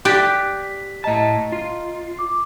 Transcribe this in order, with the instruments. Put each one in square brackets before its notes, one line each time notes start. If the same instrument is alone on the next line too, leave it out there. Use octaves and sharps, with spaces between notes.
[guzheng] G4 D5 [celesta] F#6 B6 D7
[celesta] B6
[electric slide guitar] A2 A5 [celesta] D#5 A#5
[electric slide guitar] F4
[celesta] D6